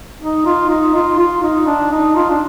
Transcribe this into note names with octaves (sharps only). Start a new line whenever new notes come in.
D#4
F4
D#4
F4
F4
D#4
D4
D#4
F4
D4